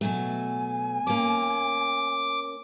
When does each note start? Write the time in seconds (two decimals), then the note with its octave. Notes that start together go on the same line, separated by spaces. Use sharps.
0.01 B2 F#3 A3 G#5
1.07 A#3 C#4 D6